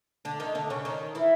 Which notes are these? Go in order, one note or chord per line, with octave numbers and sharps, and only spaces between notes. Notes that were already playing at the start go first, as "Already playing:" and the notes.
D3 D4
D#3 D#4
D3 D4
C#3 C#4
D#3 D#4
E3 E4